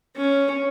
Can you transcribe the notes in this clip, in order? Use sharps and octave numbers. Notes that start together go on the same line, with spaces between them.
C#4